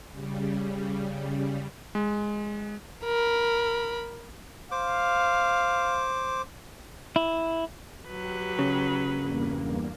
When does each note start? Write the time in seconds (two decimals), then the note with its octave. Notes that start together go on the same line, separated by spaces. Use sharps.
0.12 C#3 G3
1.95 G#3
3.04 A#4 B5
4.71 C5 F5 D6
7.16 E4
8.08 F#3 G4 B4
8.59 C#3
9.08 E2 G2 A#3